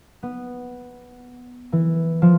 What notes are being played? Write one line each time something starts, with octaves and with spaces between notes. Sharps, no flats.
B3
E3
F3